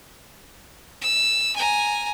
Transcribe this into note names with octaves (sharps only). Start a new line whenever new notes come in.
E6
G#5 A#5